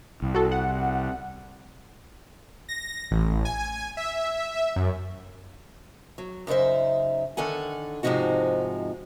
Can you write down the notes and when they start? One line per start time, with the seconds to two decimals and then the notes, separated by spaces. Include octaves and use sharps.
0.22 C2
0.35 F#4 A4
0.52 F#5
2.69 A#6
3.11 A1
3.45 G#5
3.97 E5
4.76 F#2
6.18 F#3
6.47 F#2 C#3 D#4 C5 E5
7.37 D3 D#3 A4 F#5 G#5
8.03 G#2 C3 F3 G#3 D#4 F#4